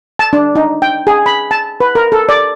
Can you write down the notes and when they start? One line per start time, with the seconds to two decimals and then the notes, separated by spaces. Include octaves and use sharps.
0.19 A5
0.33 D4
0.55 D#4
0.82 G5
1.07 G#4
1.26 B5
1.51 A5
1.80 B4
1.95 A#4
2.12 A4
2.29 D5